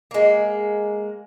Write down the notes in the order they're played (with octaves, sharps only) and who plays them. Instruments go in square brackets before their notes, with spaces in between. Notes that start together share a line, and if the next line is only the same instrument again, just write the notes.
[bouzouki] G#3 A#3